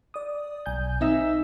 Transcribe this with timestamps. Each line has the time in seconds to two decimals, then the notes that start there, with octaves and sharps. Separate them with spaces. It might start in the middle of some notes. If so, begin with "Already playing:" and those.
0.14 D5 D#6
0.66 B1 G#5 G6
1.01 C4 D#4 E5